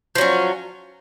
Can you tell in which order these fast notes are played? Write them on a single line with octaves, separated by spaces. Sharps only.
F3 F#3 C#4